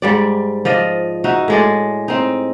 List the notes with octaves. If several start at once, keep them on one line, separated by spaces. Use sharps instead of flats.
G#2 G3 D5
F3 D5 D#5
D#4 F#4 E5
A2 G#3 D5
C4 D#4